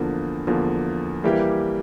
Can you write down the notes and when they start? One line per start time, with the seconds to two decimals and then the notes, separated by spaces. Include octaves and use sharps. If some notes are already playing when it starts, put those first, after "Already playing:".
Already playing: E2 D3 F3 A#3
0.47 E2 D3 F3 A#3
1.24 E3 G3 A#3 E4 G4